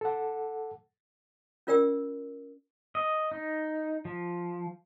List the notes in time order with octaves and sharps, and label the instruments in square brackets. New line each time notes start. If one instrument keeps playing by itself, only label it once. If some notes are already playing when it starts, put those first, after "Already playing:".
[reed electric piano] A4 F#5
[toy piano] C#4 F4 A#4 D5 G5 E6
[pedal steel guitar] D#5
D#4
F3